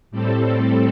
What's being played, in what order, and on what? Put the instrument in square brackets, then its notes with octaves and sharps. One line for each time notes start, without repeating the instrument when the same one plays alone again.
[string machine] A2 G3 C4 A4